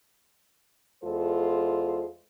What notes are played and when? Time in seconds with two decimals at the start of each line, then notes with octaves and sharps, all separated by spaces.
1.03 E2 G#3 F4 A4 C5